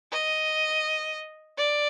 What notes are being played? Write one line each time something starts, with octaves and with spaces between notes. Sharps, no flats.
D#5
D5